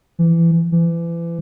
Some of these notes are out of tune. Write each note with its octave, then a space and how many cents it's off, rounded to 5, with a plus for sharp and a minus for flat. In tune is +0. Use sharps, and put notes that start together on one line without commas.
E3 +25
E3 +35